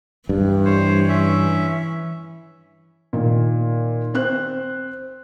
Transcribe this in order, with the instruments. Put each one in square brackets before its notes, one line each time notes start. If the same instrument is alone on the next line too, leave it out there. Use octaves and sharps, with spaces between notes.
[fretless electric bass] G2 [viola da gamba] E3
[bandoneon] C5 C#5
C#4 E5
[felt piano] A#2 D#3
C4 C5 F#6